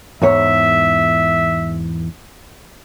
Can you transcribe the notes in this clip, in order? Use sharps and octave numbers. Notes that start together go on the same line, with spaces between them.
E2 G#2 C#5 E5